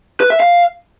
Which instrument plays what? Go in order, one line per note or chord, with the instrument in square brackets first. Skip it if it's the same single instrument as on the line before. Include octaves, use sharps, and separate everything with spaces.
[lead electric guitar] B4
E5
F5